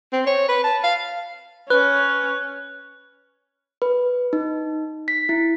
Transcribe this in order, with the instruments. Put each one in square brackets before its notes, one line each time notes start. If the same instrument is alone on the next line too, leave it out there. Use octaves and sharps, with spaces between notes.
[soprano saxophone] C4
C#5
B4
A5
F5
[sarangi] C#4 [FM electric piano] B4 [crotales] F#6
[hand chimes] B4
D#4
B6
E4